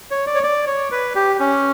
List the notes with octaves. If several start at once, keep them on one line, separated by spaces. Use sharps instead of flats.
C#5
D5
C#5
D5
C#5
B4
G4
C#4